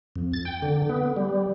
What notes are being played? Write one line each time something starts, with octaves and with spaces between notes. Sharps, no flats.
F2
A6
G5
D3
B3
G3